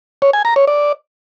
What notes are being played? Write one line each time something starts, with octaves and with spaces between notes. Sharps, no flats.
C#5
G#5
A#5
C#5
D5